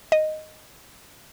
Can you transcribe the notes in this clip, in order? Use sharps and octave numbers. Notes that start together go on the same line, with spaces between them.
D#5